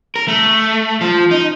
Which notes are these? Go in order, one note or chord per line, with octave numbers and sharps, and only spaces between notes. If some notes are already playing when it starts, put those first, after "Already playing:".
A#4
A3
F3
D#4